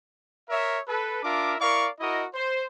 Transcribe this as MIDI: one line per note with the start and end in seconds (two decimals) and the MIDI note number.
0.49 0.79 70
0.49 0.79 73
0.49 0.79 76
0.88 1.19 69
0.88 1.19 71
1.23 1.54 62
1.23 1.54 65
1.23 1.54 70
1.23 1.54 76
1.23 1.54 86
1.59 1.88 64
1.59 1.88 70
1.59 1.88 74
1.59 1.88 77
1.59 1.88 85
2.00 2.25 64
2.00 2.25 66
2.00 2.25 70
2.00 2.25 75
2.35 2.65 72